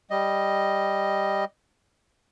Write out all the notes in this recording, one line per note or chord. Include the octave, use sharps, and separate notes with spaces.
G3 D#5